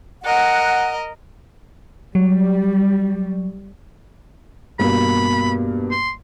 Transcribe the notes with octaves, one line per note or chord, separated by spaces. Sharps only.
A#4 D#5 F#5
F#3 G3
G2 B2 A#3 B5
C6